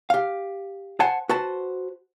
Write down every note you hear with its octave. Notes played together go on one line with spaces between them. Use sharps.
G4 F5
C5 F#5 G#5 A5
F#4 B4 C5 A5